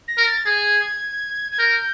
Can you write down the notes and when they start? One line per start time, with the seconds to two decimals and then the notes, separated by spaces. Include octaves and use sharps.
0.08 A#6
0.17 A#4
0.27 A6
0.46 G#4 G#6
1.52 G#6
1.59 A#4 G6